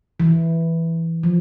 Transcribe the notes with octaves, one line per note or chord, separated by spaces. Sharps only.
E3
F3